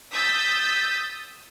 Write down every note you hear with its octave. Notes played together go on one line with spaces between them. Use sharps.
D#6 E6 G6 A6 B6